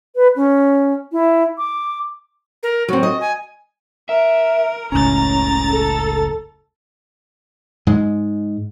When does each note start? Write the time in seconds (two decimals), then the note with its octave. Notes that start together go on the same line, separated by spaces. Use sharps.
0.15 B4
0.36 C#4
1.12 E4
1.58 D6
2.63 A#4
2.88 F#3 C4 F#4
3.03 D#5
3.20 G#5
4.09 A#4 E5
4.92 F#1 C#2 A2 C#4 A#5 A6
5.71 A4
7.87 G#2 G#3